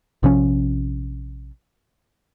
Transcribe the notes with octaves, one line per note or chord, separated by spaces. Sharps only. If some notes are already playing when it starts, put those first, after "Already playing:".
A#1 C3 F3 C#4